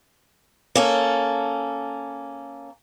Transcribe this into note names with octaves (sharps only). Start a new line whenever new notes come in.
A#3 C#4 A4